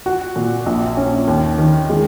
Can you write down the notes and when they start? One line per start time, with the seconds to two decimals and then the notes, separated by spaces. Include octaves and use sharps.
0.06 F#4
0.36 A#2
0.66 A#1
0.97 C#4
1.27 D#2
1.58 D#3
1.90 G#3